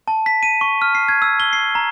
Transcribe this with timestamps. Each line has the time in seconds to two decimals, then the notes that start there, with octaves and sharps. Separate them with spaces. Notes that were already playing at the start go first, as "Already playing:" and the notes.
0.08 A5
0.26 B6
0.43 D#7
0.61 C#6
0.82 F6
0.95 C7
1.09 G#6
1.22 E6
1.40 G7
1.53 C7
1.75 A#5